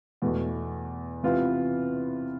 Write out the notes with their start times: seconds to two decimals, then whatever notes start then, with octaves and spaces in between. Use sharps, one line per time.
0.22 E2 B2 A3
1.23 C3 E3 B3 F4